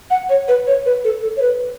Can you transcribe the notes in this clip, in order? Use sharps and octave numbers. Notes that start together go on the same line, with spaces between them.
F#5
C#5
B4
C#5
B4
A4
A4
C#5
B4